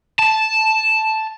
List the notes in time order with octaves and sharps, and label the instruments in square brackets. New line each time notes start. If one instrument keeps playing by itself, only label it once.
[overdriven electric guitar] A5